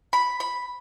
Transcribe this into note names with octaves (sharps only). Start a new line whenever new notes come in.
B5
B5